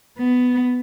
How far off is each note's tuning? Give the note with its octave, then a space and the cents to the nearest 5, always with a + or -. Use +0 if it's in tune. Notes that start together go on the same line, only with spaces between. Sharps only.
B3 +10